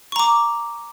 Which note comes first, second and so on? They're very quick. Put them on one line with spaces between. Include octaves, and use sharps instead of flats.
C#6 A#5 D6